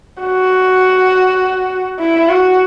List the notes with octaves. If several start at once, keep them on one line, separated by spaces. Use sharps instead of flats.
F#4
E4
F#4